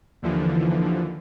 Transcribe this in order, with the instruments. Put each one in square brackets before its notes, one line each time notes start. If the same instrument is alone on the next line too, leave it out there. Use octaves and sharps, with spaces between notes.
[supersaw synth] D#2 D3 E3 F3